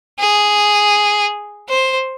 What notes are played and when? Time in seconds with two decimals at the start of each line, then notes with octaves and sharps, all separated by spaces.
0.20 G#4
1.69 C5